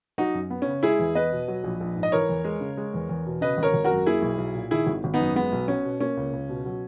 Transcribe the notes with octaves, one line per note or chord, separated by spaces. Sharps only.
F#3 D#4 F#4
F#2
B3
C#3 C#4
G#3 E4 G#4
E2
B3 B4 D#5
B2
F#3
A#1
A#1
G#2
D#5
E3 A#4 C#5
E2
G#3
C#3
G#3
E2
E2
B2
C#3 B4 D#5
G#1
A#4 C#5
G#1
F#4 A#4
F#2
A#3 E4 G#4
B1
B1
A#2
D#3 E4 G#4
G#1
G#1
B3 D#4
F#2
G#3 B3
B1
B3 C#4
B2
A#3 C#4
C#2
C#2
B2
F#3